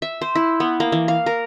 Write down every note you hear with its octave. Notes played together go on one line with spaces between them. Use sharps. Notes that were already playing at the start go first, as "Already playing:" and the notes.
E5
C5
E4
B3
A#3
E3
F5
A#4